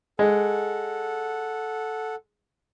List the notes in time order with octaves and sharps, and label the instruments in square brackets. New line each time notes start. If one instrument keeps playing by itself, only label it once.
[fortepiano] G#3 [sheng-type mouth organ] A4 F#5